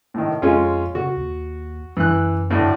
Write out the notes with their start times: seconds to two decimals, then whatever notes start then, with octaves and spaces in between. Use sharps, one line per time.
0.14 A2 D#3
0.42 F2 G#3 C#4 F4
0.95 C#3 F#4
1.17 D#2
1.97 F#2 E3 F#6
2.50 D2 A2